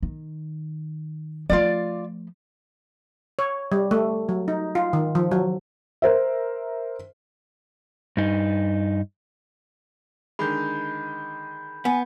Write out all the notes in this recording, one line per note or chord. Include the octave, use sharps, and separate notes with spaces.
D#3
F3 A3 F4 D5
C#5
G3
A3
F#3
D#4
F4
D#3
F3
F#3
A#4 C5 E5
G2 D#4
D3 D#3 G#3 B5 G6
B3 G#5